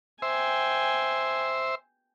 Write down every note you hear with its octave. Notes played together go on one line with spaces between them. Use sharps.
C5 E5 G5 G#5